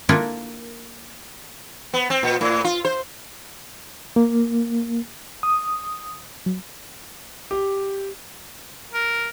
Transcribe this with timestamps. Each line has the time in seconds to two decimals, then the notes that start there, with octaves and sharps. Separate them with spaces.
0.09 A#3 D4 E4 F4 A4 A#4
1.94 B3
2.10 C4
2.23 A#2
2.41 A2
2.64 F4
2.85 C5
4.16 A#3
5.43 D#6
6.46 F#3
7.51 G4
8.93 A#4